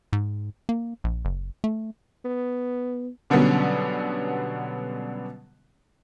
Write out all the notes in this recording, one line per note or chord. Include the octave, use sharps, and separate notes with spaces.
G#2
A#3
A#1
F#1
A3
B3
B2 D3 F#3 G3 B3 C#4